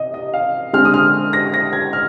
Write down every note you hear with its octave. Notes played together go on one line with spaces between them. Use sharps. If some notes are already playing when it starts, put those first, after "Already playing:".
Already playing: C3 D#5
D#5
F5
D3 G#3 C4 F6
D#6
F6
A#6
A#6
G#6
F6